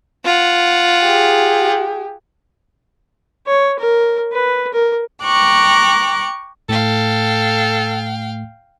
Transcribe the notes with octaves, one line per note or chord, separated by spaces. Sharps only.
F4 F#5
G4 G#4
C#5
A#4
B4
A#4
G5 A#5 C#6 D6 F#6
A2 A3 A4 F5 G5